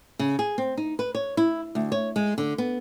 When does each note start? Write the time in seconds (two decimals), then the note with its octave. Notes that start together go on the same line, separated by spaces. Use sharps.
0.19 C#3
0.39 G#4
0.58 C4
0.77 D#4
0.99 B4
1.15 C#5
1.37 E4
1.75 D2
1.92 C#5
2.16 G#3
2.38 D3
2.58 B3